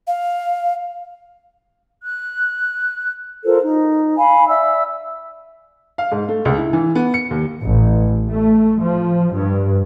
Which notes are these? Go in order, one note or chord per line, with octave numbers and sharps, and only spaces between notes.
F5
F#6
F4 A4 A#4 C5
D#4
F5 G#5 B5
D5 E5 E6
F5
G#2
A3
C#2
E4
E3
B3
C#7
D#2
A1
A3
F3
G2